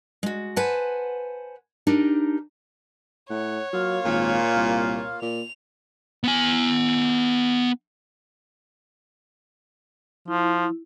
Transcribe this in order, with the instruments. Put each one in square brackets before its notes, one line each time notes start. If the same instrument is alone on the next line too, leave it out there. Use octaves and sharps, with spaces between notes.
[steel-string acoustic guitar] G#3 F#4
B4 C5 F#5 G#5 A5
D4 D#4 G4 A#4
[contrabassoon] A2 [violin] C#5 [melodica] F#5
[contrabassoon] F#3 [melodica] A#3 F4 F5
[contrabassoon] G#1 [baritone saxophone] A#2
[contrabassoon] C2
[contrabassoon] A#2 [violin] F7
[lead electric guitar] B3 G#5
[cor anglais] F3 [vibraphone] E4